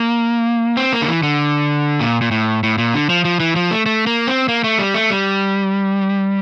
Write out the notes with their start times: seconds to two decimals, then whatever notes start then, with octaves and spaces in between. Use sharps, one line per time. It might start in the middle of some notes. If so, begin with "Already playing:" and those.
Already playing: A#3
0.77 C4
0.93 A#3
1.02 D3
1.08 E3
1.23 D3
2.00 A#2
2.21 A#2
2.31 A2
2.63 A2
2.78 A#2
2.94 D3
3.10 F3
3.25 F3
3.40 E3
3.56 F3
3.71 A3
3.86 A3
4.07 A#3
4.27 C4
4.48 A#3
4.64 A3
4.79 G3
4.94 A3
5.10 G3